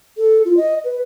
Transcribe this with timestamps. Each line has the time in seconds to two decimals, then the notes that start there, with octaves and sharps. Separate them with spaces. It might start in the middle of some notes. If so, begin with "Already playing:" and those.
0.18 A4
0.45 F4
0.57 D#5
0.84 B4